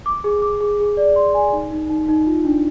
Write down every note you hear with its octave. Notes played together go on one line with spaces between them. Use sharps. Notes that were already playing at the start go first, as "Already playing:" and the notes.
D6
G#4
D6
G#4
G#4
D5
C6
G#5
D#4
D#4
D#4
D#4
F4
D4